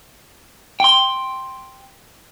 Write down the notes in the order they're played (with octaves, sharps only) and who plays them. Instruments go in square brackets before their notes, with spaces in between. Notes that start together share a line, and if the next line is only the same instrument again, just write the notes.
[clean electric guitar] G5 C6